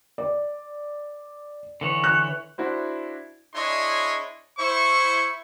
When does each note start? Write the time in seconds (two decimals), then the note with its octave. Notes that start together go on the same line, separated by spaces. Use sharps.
0.18 D5
1.81 D3 E3 C#5
2.04 F#6
2.58 D4 E4 F#4 C5
3.54 D4 E4 G#4 C#5 D#5 C6
4.58 E4 C5 C#6